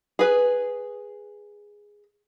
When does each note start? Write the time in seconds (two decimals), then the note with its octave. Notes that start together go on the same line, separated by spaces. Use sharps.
0.19 G#4 B4